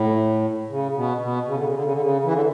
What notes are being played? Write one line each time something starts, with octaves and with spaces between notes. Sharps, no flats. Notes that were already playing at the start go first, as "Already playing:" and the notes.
Already playing: A2
C#3
B2
B2
C#3
D3
C#3
D3
C#3
D3
C#3
E3
D3